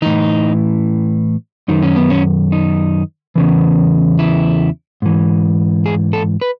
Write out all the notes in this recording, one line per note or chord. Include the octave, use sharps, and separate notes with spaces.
A2 E3 D#4
F#2 D#3 D#4
C#4
B3
C#4
D#4
E2 C#3 E3
E4
G#2 E3
G#4
A4
B4